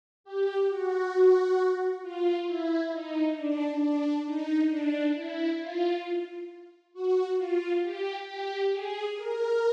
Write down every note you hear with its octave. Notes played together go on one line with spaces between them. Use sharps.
G4
F#4
F4
E4
D#4
D4
D4
D#4
D4
E4
F4
F#4
F4
G4
G4
G#4
A#4